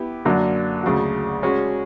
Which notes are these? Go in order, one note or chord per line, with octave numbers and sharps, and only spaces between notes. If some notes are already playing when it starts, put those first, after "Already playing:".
Already playing: B3 E4 G4
F#2 D3 F#3 A#3
D2 C#3 F#3
G#3 C#4 F#4